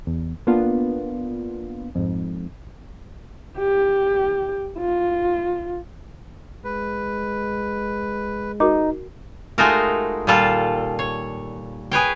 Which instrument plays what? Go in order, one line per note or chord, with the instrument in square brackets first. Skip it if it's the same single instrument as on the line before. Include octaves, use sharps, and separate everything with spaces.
[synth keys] E2
A#3 B3 D4 F4
F2 G#2
[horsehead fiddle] G4
F4
[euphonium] G#3 [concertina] B4
[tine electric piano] D#4 [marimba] F#4 A#4 D6
[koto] G#3 A3 D#4 F4 F#4 A#4
A#2 D#3 G3 F4 A4
C#5
G#4 B4 C#5 G5